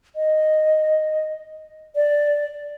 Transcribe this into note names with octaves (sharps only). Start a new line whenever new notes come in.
D#5
D5